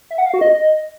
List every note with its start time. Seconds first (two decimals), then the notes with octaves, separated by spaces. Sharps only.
0.11 E5
0.18 F#5
0.26 F5
0.34 F#4
0.41 D#5